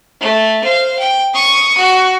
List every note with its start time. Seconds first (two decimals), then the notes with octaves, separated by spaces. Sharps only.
0.21 A3
0.64 C5 F5
0.99 G5
1.34 C#6 D#6
1.77 F#4